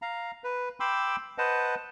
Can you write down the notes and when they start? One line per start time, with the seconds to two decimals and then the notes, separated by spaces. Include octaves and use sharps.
0.02 F5 A#5
0.44 B4
0.80 G5 B5 C6 D6 E6
1.38 B4 C5 D#5 F#5 A5